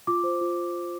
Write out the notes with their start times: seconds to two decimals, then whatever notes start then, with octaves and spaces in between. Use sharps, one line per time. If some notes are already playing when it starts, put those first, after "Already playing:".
0.07 F4 D6
0.24 C5
0.41 F4